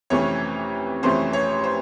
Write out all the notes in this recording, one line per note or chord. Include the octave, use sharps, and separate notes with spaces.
F2 C3 E3 A3 C#4 C#5
F2 C3 E3 A3 C#4 C5
C#5
C5